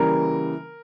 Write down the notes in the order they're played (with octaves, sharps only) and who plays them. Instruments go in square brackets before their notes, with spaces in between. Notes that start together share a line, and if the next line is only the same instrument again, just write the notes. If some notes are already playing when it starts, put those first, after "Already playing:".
Already playing: [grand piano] C#3 E3 G3 A#3 A#4